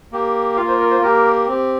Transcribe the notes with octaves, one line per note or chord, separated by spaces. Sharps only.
A#3 G4
A#3 F4 F5
C5
A#4
C5
A#3 G4 A#4
C4 G4